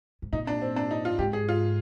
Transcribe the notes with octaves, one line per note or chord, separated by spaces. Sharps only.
G#2
A#2 D#4
D4
C4
D4
D#4
F4
G#2 G4
G#4
F4